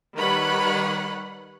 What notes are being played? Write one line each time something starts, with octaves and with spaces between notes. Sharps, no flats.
D#3 G3 B4 C#5 F#5 B5